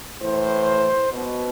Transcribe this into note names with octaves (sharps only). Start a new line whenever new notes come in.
A2 E3 C5
B2